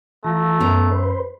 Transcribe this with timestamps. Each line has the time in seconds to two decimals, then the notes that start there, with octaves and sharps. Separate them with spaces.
0.24 E3 A3 F4 A#5
0.60 F#2 B3 A#5
0.91 B4 C5